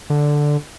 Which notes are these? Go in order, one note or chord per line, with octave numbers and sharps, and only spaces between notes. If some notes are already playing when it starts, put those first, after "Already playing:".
D3